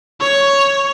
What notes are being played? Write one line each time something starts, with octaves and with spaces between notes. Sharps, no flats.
C#5